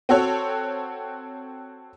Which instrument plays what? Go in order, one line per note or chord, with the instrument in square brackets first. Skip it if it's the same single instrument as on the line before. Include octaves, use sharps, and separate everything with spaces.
[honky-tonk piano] C4 F#4 A4 C#5